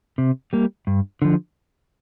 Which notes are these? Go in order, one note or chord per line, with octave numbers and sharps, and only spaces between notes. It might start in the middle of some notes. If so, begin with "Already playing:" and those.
C3
G3 A#3
G2
D3 F3